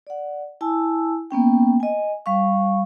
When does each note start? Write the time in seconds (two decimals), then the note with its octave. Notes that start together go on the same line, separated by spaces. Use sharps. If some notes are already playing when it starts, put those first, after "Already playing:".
0.07 D5 F#5
0.61 E4 G#5 A5 E6
1.31 A#3 B3 C#4 G5
1.80 D#5 G#5
2.26 G3 F5 C#6